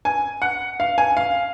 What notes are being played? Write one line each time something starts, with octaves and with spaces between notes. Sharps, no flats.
G#5
F#5
F5
G#5
F5